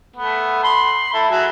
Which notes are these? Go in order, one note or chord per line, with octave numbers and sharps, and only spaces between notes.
A3 B3
B5 C6
A3 E4
F#3 G#4 E5